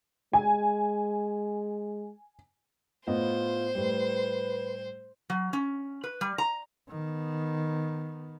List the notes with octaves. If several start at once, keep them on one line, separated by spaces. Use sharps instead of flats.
G#3 G#5
A2 B3 F4 C5 D#5
A2 G3 B4
F#3
C#4
B4
G3
A#5
D#3 B3